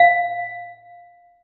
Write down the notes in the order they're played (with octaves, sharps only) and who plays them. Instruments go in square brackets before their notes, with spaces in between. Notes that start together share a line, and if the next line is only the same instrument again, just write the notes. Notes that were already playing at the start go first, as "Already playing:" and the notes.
Already playing: [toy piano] F5